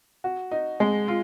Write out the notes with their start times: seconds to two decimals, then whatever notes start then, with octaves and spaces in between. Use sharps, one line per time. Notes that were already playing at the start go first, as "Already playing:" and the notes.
0.24 F#4
0.51 D#4
0.80 G#3
1.08 F4